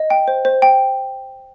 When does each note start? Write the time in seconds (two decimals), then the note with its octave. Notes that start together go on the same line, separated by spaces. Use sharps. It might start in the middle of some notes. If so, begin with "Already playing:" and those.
Already playing: D#5
0.10 G5
0.28 C5
0.45 C5
0.62 G5